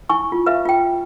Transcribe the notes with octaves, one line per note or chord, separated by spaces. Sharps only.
E4 G#5 C#6
F4
B4 E5 F5
F4 G5